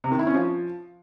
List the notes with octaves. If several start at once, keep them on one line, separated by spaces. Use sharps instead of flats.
C3
D#3
E4
C#4
F3